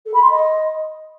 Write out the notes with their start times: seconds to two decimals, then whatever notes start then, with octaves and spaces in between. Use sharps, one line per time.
0.05 A4
0.13 B5
0.21 C6
0.29 D#5